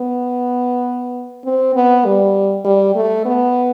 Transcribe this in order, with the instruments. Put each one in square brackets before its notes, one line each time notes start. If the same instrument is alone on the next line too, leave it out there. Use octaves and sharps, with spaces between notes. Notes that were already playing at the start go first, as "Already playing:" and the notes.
Already playing: [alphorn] B3
C4
B3
G3
G3
A3
B3